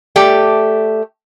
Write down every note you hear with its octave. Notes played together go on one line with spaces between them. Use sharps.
A3 G4 D5